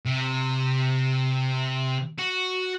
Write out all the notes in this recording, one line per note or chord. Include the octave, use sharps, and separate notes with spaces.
C3
F#4